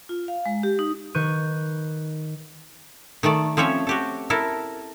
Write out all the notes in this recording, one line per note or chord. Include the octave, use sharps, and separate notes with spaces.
F4
F5
G#3
G4
D#4
D#3 B4 C#6 F#6 G6 D#7
D#3 A3 A4 D5
F3 C4 C#4 C#5 E5
F#4 G4 A4
E4 A4 A#4